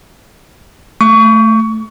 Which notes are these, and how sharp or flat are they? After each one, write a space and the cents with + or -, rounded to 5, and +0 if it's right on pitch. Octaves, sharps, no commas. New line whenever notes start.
A3 +0 C#6 +25